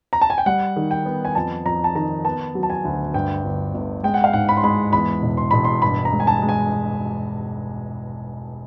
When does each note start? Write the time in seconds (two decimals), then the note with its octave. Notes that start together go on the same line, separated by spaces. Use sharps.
0.13 A#5
0.21 A5
0.30 G#5
0.38 G5
0.46 G3 F#5
0.76 D#3
0.91 G5
1.06 B3
1.25 G#5
1.35 F2 A5
1.66 F2 A#5
1.84 A5
1.95 D#3 A#5
2.25 B3 A5
2.55 F#3
2.63 A5
2.70 G#5
2.85 D2
3.14 G2 G5
3.44 G1
3.74 G1
4.03 G#3 G5
4.14 F#5
4.24 F5
4.33 G#2 F#5
4.49 B5
4.57 C6
4.63 G#3 B5
4.93 E2 B5
5.23 E1
5.37 C6
5.51 E1 B5
5.65 C6
5.82 G2 B5
6.05 A#5
6.12 G#3
6.20 G#5
6.27 A5
6.42 G#3
6.49 G#5